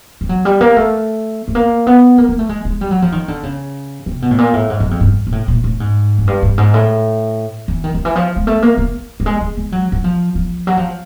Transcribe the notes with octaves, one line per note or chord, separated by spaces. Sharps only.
G3
F#3
G3
A#3
A3
A3
A#3
B3
A#3
A#3
A3
G#3
G#3
G3
F#3
F3
D#3
D3
C#3
C3
B2
A2
A#2
A2
G#2
F#2
F2
G2
A#2
A2
A#2
A2
G#2
F#2
G2
G2
G#2
A2
E3
D#3
D#3
E3
F3
G#3
A3
A#3
A#3
G3
G#3
G#3
G#3
F#3
F#3
F3
F3
F#3
F3